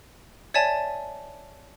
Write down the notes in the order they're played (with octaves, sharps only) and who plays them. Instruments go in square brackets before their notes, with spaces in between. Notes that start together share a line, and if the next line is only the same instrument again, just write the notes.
[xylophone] C#5 D5 E5 G#5 A5